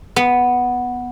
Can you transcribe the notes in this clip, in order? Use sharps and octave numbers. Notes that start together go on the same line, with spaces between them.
B3